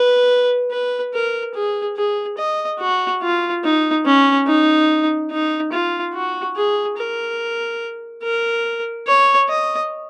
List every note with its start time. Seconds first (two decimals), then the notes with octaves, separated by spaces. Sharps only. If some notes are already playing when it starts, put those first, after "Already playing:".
Already playing: B4
0.71 B4
1.14 A#4
1.55 G#4
1.97 G#4
2.38 D#5
2.80 F#4
3.22 F4
3.64 D#4
4.06 C#4
4.47 D#4
5.31 D#4
5.72 F4
6.14 F#4
6.56 G#4
6.98 A#4
8.23 A#4
9.07 C#5
9.49 D#5